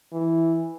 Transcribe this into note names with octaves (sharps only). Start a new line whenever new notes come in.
E3